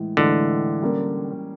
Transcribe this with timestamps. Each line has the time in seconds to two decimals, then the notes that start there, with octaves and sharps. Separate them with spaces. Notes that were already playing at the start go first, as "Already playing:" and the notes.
Already playing: A2 E3 G#3
0.17 A2 D3 E3 G#3
0.82 G3 A#3 C#4